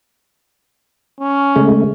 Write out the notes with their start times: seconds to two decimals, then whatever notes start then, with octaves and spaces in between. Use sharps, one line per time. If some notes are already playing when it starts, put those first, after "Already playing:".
1.21 C#4
1.56 C#3 G#3 A3